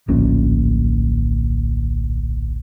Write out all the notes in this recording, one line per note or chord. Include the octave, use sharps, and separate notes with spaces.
D1 A#1 A#2 C#4